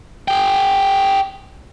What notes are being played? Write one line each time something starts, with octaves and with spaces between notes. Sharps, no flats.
G#4 G5